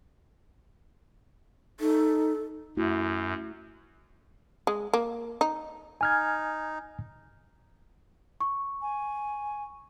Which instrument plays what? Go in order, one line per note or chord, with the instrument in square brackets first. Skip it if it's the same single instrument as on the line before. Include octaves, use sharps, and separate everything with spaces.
[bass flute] D#4 [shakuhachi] A4
[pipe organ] F#2 [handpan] A3 E4 F#4
[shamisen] G#3
A#3
D#4
[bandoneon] D#4 [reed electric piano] G#5 F6 G#6
[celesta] C#6
[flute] G#5